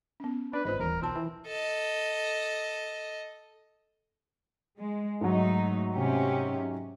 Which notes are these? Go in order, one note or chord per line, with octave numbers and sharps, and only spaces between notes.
B3 C#4
D4 B4
G#1 F4 B4 C5 D#5
D#1 E3 A#4
B1 C4 F4 A5
E3
A4 D#5
G#3
G#2 F#3 A3 D#4
C3 C#4 G4